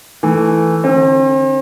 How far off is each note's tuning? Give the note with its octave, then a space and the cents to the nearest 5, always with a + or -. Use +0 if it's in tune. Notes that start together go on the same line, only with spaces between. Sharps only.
E3 +0 A3 +0
D3 +25 C4 +40